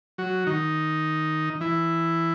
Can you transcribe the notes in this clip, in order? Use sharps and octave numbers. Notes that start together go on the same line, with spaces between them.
F#3 F#4
D#3 D#4
E3 E4